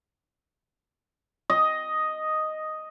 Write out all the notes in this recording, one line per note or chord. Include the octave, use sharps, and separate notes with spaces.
D#5